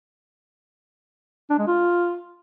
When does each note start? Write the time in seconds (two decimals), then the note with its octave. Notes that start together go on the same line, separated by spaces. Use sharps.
1.50 D4
1.59 G#3
1.68 F4